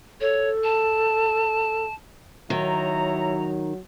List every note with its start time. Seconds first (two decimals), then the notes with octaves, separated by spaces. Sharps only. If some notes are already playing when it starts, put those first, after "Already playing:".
0.21 A4 C#5
0.64 A5
2.50 D#3 F#3 E4 C#5 A#5